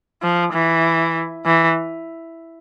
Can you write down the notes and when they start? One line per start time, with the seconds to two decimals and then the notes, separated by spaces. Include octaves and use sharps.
0.23 F3
0.53 E3
1.46 E3